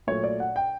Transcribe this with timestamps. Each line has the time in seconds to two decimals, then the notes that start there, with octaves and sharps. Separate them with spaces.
0.07 A#2 F#3 A3 C#5
0.24 D5
0.40 F#5
0.56 G5